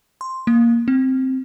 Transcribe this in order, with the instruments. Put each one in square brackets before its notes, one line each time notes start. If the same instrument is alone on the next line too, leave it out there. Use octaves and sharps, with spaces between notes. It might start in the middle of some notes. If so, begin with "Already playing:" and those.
[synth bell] C6
A#3
C4